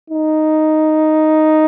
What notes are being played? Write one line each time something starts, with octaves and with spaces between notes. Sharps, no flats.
D#4